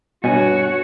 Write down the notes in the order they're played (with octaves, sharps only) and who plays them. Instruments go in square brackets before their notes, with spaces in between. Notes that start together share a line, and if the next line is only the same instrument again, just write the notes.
[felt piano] G2 G#5 D#7 [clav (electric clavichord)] B2 [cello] F#4 C#5